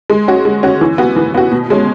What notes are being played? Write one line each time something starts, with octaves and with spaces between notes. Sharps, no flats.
G#3
C#4 F#4
G#3
C#4 F#4
E3
B3 F#4
E3
B3 F#4
B2
G#3 C#4